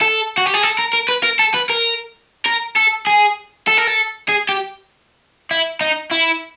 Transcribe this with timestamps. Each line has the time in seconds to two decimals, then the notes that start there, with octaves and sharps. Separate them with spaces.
0.01 A4
0.38 F#4
0.46 G4
0.54 G#4
0.63 A4
0.79 A#4
0.93 A#4
1.09 B4
1.24 A#4
1.39 A4
1.54 B4
1.69 A#4
2.46 A#4
2.77 A4
3.07 G#4
3.68 A4
3.77 A#4
3.87 A4
4.29 G#4
4.49 G4
5.51 E4
5.81 D#4
6.12 E4